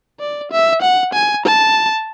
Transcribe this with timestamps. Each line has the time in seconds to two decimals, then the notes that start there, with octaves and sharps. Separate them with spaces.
0.20 D5
0.52 E5
0.82 F#5
1.13 G#5
1.46 A5